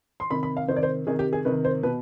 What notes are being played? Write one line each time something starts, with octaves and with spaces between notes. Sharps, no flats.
C6
C3 D#3 B5
B5
F5
C3 D#3 C5
D5
C5
C3 D#3 G#4
G4
G#4
C3 D#3 B4
C5
B2 B4